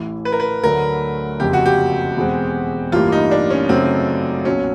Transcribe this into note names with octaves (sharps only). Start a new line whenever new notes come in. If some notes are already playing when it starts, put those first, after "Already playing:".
Already playing: A1 A2 E3
B4
A#4
B4
D2 D3 F#3 A3 A#4
F#1 F2 C#3 G4
F#4
G4
E2 B2 G#3 C4
A1 G2 E3 G3 A#3 F4
D#4
D4
C#4
F#2 C#3 F#3 A3 C4
B1 A#2 F#3 C#4